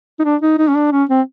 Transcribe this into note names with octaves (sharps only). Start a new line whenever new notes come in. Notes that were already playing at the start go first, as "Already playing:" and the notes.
D#4
D4
D#4
D#4
C#4
D4
C#4
C4